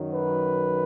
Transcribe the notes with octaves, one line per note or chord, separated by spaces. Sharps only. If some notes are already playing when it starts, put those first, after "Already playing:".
Already playing: F#2 D#3 F#3
B4